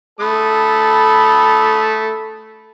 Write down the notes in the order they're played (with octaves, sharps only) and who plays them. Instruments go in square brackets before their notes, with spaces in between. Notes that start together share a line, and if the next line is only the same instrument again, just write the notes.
[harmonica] A3 D#6 [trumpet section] A4 B5